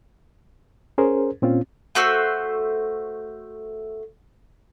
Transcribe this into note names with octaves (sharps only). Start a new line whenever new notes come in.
C#4 G#4 A#4 C5
A#2 C4 C#4 F4
A3 F#4 C5 E6